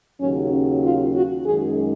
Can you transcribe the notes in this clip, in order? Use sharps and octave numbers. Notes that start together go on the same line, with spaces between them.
D#2 C#3 F#3 C#4
F4
F#4
F#2 D#3 G#3 G#4